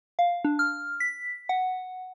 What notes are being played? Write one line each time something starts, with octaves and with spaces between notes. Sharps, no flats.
F5
D4
F6
B6
F#5